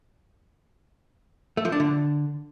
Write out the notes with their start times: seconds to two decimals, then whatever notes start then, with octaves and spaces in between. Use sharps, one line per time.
1.57 A3
1.65 F3
1.72 D4
1.80 D3